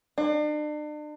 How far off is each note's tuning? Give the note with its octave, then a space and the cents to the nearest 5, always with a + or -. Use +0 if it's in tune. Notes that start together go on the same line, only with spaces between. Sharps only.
D4 +40